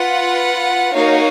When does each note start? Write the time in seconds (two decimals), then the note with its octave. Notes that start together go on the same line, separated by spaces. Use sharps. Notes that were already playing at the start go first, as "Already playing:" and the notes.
Already playing: F4 B4 F#5
0.93 A#3 D#4 F#4 C#5 F5